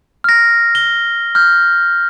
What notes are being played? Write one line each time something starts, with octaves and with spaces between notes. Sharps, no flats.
F6 A#6
G7
F6 G6